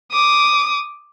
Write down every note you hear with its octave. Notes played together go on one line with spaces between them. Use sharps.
D6 D#6